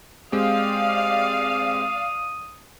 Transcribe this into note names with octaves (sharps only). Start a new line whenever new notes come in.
G#3 C4 G4 D5 F5 D#6